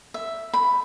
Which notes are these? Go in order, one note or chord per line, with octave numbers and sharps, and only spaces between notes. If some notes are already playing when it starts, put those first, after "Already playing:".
E5
B5